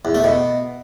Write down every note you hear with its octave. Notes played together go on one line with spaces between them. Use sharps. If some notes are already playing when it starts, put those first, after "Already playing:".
E2
A3
B2